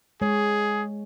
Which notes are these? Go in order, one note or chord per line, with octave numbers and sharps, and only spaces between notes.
G#3 G#4 C#5